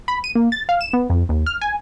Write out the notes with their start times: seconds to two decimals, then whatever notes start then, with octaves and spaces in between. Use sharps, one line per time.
0.08 B5
0.24 D#7
0.35 A#3
0.52 A6
0.69 F5
0.81 E7
0.93 B3
1.10 F2
1.29 D#2
1.46 F6
1.61 G#5